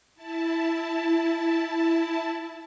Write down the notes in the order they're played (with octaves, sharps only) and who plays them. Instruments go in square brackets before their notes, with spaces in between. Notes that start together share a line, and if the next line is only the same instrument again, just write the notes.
[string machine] E4 A5